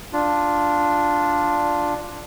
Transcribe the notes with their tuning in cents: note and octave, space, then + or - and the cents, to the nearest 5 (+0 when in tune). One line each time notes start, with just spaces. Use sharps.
D4 +0 F4 +0